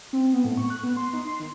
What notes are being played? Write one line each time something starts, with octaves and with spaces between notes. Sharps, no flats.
C4
B3
A2
C#6
F#6
B3
C6
D#4
C6
D#3